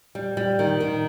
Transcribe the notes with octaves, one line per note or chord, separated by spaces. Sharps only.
G3
G3
D#3
D#3